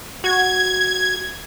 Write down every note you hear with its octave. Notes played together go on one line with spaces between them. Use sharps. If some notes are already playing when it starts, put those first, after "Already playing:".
F#4 G#6